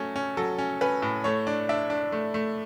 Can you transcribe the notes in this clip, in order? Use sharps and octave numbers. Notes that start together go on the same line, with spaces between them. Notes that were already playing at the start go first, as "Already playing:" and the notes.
Already playing: F#3 A3 C#4
C#4
F#3 A4
C#4
C#4 B4
A2
A3 C#5
D4
D4 E5
D4
A3
A3